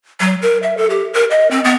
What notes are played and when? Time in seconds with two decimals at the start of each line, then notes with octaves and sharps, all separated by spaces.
0.20 F#3
0.42 A#4
0.63 E5
0.77 A4
0.90 G4
1.14 A#4
1.31 D#5
1.51 C4
1.64 B3